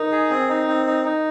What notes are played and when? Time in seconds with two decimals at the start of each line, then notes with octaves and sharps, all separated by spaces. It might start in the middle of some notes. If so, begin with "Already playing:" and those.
Already playing: D#4 A#4
0.12 G#4
0.30 C4
0.49 D#4
0.67 C4
0.87 D#4
1.05 D#4